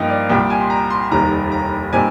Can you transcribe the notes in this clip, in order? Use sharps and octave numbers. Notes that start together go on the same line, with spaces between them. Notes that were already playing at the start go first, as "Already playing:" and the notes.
Already playing: G2 F3 A#3 D#4 D#5 F5 G5
D5
C2 A#2 G3 G5
G#5
C6
A#5
C6
F1 D#2 D#3 G3 A#5
A#5
A#2 G3 C4 D#4 G#5